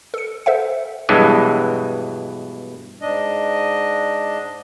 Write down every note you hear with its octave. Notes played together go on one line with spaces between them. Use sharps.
A4 C#7
A4 C5 E5 F#5
G2 B2 E3 F#3 G#3
G#2 D4 D#5